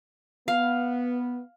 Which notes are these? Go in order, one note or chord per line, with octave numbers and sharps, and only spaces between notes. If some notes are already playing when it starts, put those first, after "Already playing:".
B3 F5